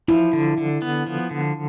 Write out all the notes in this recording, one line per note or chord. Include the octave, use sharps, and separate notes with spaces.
F3 E4
D3
D3
B3
F3
D3